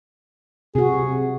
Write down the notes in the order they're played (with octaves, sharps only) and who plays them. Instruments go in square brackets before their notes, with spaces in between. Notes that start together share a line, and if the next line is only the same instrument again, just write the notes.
[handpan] C3 F#4 [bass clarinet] G#4